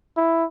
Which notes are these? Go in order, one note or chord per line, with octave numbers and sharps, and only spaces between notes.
E4